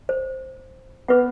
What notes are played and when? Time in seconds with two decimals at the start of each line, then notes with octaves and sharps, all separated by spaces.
0.09 C5
1.08 B3 B4 F#5